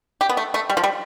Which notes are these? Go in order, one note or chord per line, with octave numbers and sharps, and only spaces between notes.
G4
B3
A3
A3
G3
F3
G3